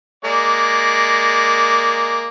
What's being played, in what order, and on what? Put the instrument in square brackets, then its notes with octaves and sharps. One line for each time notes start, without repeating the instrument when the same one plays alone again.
[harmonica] G#3 A#3 D5